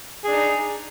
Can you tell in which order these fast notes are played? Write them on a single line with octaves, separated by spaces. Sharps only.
G#4 D4 D#4